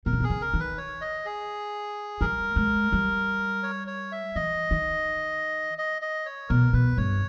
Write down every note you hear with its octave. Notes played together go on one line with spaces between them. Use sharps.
B2 A#4
C#3
B2 G#4
C#3
A#4
D#3
B4
C#5
D#5
G#4
G3 A#4
G#3
G3
C#5
C#5
E5
E3 D#5
D#3
D#5
D#5
C#5
B2 A#4
B2 B4
G2 C#5